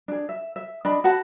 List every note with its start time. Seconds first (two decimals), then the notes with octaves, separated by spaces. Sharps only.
0.08 D4 G#4
0.29 E5
0.56 E5
0.85 D4 D#5 B5
1.04 F#4 F#5 A5 B5